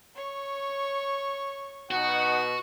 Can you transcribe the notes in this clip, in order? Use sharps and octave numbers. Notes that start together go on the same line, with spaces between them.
C#5 C#6
B2 D#4 F#4 F#5